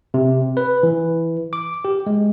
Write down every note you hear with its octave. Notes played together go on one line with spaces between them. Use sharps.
C3
B4
E3
D6
G4
G#3